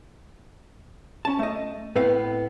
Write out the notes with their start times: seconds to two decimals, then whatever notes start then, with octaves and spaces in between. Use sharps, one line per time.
1.25 C#4 A5
1.39 A3 D#5
1.96 A2 B3 C4 B4 F5